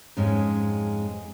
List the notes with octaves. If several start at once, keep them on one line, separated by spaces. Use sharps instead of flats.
F2 G#2 G#3 C#4